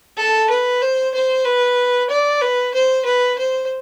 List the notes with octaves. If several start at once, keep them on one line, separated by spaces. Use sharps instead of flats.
A4
B4
C5
C5
B4
D5
B4
C5
B4
C5